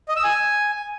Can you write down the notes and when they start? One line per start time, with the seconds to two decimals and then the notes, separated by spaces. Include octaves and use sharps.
0.09 D#5
0.16 E6
0.24 G#5